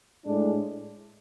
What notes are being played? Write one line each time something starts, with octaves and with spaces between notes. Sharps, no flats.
A2 G#3 D4